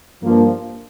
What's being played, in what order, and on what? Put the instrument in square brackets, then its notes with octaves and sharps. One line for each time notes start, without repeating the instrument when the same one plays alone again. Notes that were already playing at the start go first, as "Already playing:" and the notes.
[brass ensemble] G2 F3 A#3